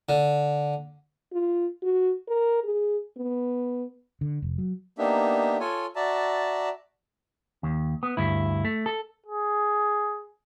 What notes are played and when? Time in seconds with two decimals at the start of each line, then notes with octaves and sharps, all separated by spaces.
0.09 D3
1.32 F4
1.83 F#4
2.28 A#4
2.64 G#4
3.17 B3
4.21 D3
4.42 F1
4.58 F#3
4.98 A#3 B3 D4 D#4 G4 E5
5.60 F4 A4 C#5 G#5
5.96 F#4 D5 E5 A5 A#5
7.63 D#2
8.03 B3
8.17 D2 G2 E4
8.65 A3
8.86 A4
9.26 G#4